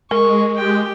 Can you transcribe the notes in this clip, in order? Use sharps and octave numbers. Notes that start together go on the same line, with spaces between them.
G#3 A#4 C#6
G4 G5